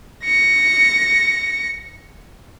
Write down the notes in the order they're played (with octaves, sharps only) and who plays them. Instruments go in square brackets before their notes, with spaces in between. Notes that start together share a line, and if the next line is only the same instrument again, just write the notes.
[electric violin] A#6 C#7